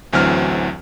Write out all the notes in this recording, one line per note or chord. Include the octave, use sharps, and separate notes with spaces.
A1 D2 E3 F#3 C4 F6